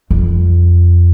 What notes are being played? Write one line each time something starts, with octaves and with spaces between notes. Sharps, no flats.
F2